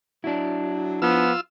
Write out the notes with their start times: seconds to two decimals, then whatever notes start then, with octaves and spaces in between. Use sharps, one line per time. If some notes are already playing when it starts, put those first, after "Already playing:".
0.24 F#3 D4 E4
1.02 F3 B3 F4 E6